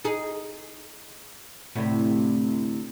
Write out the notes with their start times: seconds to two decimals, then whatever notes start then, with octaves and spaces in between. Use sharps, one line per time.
0.04 D#4 G#4
1.75 D2 A2 C3